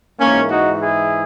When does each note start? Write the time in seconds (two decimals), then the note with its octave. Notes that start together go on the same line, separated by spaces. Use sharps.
0.18 G#2 E3 A#3 C#4
0.50 D#4 F#4
0.80 E4 G#4